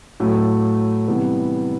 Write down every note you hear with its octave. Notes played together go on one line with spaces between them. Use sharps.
A2 F#3 A3
C3 E3 G3 B3